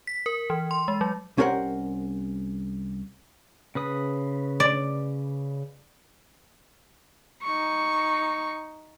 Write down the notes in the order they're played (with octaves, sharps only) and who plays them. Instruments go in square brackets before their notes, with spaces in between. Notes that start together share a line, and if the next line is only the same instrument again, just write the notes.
[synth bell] B6
A#4
E3
C6
G#3
F#3
[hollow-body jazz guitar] C2 C#4 G4 A#4 C5 F#5
[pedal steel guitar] C#3 B4 D#6
[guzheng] D5
[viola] D#4 C#6